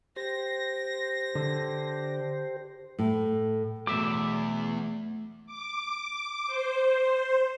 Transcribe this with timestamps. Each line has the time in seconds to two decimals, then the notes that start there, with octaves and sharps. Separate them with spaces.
0.16 G4 C5 A#6
1.35 D3
2.99 A2
3.87 E2 G2 B2 F#3 A3 E5 D6
5.46 D6
6.47 C5